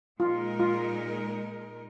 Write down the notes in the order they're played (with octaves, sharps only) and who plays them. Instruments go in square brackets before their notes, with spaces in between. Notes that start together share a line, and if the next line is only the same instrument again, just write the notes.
[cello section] A#2 G#3 D#4 A#4 [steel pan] F4
[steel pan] F4